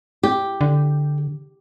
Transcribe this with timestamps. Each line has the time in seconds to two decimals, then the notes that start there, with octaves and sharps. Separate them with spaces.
0.23 G4
0.61 D3